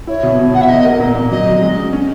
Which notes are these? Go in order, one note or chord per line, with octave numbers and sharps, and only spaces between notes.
E4 C#5
B2
B2
B2 F#5
E5
E2 D#5
A#3
A#2
A#2
F#3 D#5
F#3
G#3
C#4
C#4